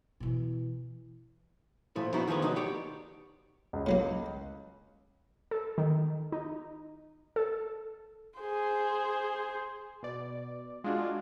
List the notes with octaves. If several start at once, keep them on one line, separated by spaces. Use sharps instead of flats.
B2 E3
A#2 F3 A3 E4
A3 B3 D#4 E4 F#4 C5
D#3 F3 A3 G#4 B4
B1 D#4 F#4 B4
G4 C#5 D5
C#2
A2 F#3 A#3
A4
D#3
D#4
A4
G#4 C5
B2 D5
G#3 D4 F4 F#4